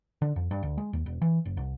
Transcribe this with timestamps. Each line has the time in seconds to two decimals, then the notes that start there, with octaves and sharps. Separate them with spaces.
0.22 D3
0.36 F2
0.51 G2
0.63 D2
0.78 G#3
0.93 D#2
1.06 E1
1.22 E3
1.45 F#1
1.57 C2